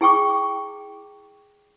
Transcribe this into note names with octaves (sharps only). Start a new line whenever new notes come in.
E4 G#4 G5 C#6 D6